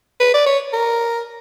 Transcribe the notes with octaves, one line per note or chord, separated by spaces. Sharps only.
B4
D5
C#5
A#4